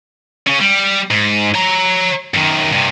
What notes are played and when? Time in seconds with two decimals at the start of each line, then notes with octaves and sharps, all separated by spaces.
0.47 C#3 C#4
0.60 G3
1.10 G#2
1.55 C#5 A#5
2.34 F#2 D#3
2.72 G2 C3